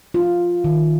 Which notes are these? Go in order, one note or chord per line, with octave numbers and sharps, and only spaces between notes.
F4
D#3